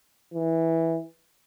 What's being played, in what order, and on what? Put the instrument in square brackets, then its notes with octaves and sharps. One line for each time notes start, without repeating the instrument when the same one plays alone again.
[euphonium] E3